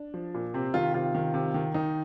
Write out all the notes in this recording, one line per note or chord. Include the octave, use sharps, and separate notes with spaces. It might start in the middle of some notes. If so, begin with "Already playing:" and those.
Already playing: D4
F3
A#2
C3 C4
D#3 F4
C3 F4
D#3
C3
D#3
D#3 D#4